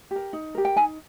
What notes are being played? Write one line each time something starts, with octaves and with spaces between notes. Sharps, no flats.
G4 A#4
D#4
G4 A#4
G5
D#4 G#5